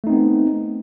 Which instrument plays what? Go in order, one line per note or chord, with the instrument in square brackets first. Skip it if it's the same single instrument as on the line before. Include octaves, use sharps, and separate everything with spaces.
[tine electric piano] A3
D#4
C4
B3